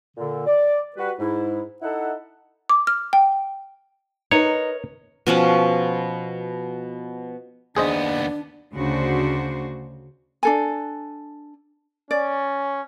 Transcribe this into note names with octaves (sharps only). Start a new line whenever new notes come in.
A#2 D3
D5
G3 F#4 B4
G#2 E4
D#4 E4 A4 E5 F#5
D6
F6
G5
D#4 A#4 B4 C#5 D#5
B2 F3 C#4 B4
D#2 B3 D4 G#4 C5 D5 D#5
D2 C#3 D4 F#4 C5
D4 A4 G#5
C#4 D5